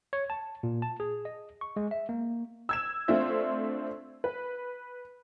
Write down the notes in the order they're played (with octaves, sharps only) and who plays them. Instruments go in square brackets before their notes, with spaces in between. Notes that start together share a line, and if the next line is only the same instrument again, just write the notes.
[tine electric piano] C#5
A5
A#2
A5
G#4
D#5
C#6
G#3
E5
A#3
[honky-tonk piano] E6 G#6 E7
A3 C4 D4 F4 C5 E5
B4